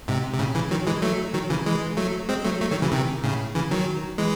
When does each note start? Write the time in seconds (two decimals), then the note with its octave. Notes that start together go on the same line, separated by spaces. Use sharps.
0.08 G#2 C3
0.34 C3
0.39 A2 C#3
0.55 C#3 E3
0.71 D#3 F#3
0.87 E3 G#3
1.02 F#3 A3
1.34 D#3 F#3
1.50 C#3 E3
1.66 E3 G#3
1.97 F#3 A3
2.29 G#3 C4
2.44 F#3 A3
2.60 F#3 A3
2.71 D#3 F#3
2.82 C#3 E3
2.92 C3 D#3
3.24 A2 C#3
3.55 C#3 E3
3.71 D#3 F#3
4.18 E3 G#3